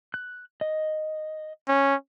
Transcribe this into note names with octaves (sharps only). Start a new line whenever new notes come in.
F#6
D#5
C#4